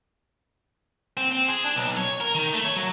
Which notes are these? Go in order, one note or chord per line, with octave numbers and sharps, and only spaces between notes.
C4
C4
G#4
D4
B1
C#5
A#4
D#3
A3
C#5
F#3